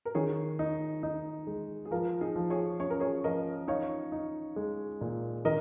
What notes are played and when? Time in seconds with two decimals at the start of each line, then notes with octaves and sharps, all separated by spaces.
0.05 A#4
0.15 D#3 G#4 C#5
0.59 D#4
1.03 D#4
1.47 G#3
1.85 G#4
1.91 F3 F4 A#4
2.21 D#4 G#4
2.36 F3
2.50 G#4 C#5
2.80 C#4 C#5
2.90 A#4
3.00 G#4 C#5
3.24 F3 A#4 D#5
3.68 D#4 C#5 F5
4.12 D#4
4.56 G#3
5.01 A#2
5.45 D#3 A#4 D#5